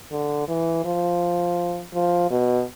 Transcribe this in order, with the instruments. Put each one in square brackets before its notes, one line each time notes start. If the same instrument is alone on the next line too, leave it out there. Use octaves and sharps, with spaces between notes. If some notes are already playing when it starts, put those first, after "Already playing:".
[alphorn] D3
E3
F3
F3
B2